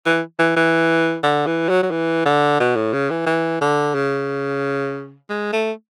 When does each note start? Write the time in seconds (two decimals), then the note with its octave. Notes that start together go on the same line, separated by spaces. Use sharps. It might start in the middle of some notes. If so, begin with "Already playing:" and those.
0.06 E3
0.39 E3
0.57 E3
1.23 D3
1.47 E3
1.69 F#3
1.83 F#3
1.91 E3
2.26 D3
2.60 B2
2.76 A2
2.93 C#3
3.10 E3
3.26 E3
3.61 D3
3.94 C#3
5.29 G#3
5.53 A3